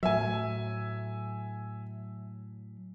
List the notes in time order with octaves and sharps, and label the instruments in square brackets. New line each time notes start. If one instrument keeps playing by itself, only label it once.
[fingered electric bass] A2 F#3 [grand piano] E5 G#5